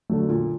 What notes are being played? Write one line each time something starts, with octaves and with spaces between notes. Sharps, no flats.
D3 F#3 A3
A#2